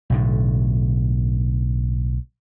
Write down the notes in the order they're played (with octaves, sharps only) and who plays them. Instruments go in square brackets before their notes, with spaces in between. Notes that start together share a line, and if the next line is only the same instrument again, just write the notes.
[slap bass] B1 A2 D3